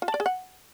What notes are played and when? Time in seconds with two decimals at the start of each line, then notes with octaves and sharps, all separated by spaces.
0.02 F4
0.08 A5
0.14 D5
0.20 G#4
0.26 F#5